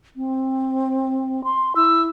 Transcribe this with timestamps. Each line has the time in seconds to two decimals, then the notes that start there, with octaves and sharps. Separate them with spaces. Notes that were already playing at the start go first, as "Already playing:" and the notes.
0.16 C4
1.44 C6
1.76 E4 E6